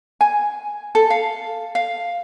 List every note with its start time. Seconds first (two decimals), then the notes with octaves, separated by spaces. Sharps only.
0.21 G#5
0.95 A4
1.10 F5
1.75 F5